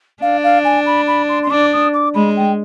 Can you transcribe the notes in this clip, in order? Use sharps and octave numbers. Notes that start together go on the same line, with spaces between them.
D4 F5
F5
G#5
B5
B5
C6
C6
D4 D6
D#6
D6
G#3 B5
G5